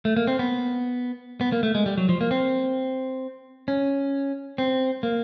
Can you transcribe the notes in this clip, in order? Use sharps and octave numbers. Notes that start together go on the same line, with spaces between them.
A3
A#3
C4
B3
B3
A#3
A3
G#3
G3
F#3
F3
A#3
C4
C#4
C4
A#3